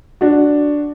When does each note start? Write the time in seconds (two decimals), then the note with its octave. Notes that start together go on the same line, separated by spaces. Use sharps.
0.21 D4 F#4